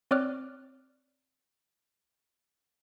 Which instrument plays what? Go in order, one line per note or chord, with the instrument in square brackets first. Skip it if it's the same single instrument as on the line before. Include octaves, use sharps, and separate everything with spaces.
[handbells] C4 C#5 D5 D6 F6 F#6